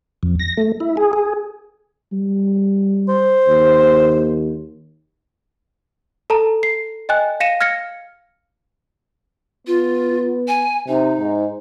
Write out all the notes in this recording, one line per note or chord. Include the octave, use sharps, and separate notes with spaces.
F2
A#6
A3
E4
G#4
G#4
G3
C5
D#2
A4 A5 A#5
C7
D#5 G5 G#5 F#6
F5 A#6 C#7 D#7 E7
F6 G#6 A#6 C#7
B3 F4
G#5
C3 D#4
G#2